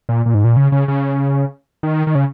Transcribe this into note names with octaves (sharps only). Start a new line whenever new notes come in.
A#2
A#2
G#2
A#2
C#3
C#3
C#3
D#3
D#3
C#3